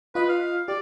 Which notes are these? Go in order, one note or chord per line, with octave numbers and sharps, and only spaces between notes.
F4 B4 D#5
F5
G4 D5